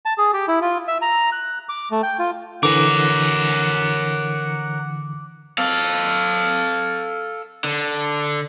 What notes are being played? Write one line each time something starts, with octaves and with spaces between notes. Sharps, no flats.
A5
G#4
G4
E4
F4
E5
A#5
F#6
D6
A3
G5
F4
D3 E3 A#4 C#5 F#5 D6
A4 F5
D3